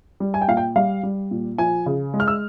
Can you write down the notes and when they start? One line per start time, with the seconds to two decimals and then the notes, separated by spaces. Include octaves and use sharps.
0.20 G3
0.34 G#5
0.42 G5
0.48 A#2 F5
0.57 G5
0.76 G3 F5
1.03 G3
1.31 A#2
1.58 F3 G#5
1.86 C#3
2.14 G#3
2.20 F6
2.28 E6